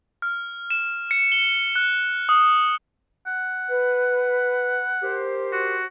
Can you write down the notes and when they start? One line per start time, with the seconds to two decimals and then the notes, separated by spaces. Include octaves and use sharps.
0.22 F6
0.71 E7
1.11 C#7
1.32 G7
1.76 F#6
2.29 D#6
3.27 F#5
3.70 B4
5.02 G4 A#4 C5
5.53 F#4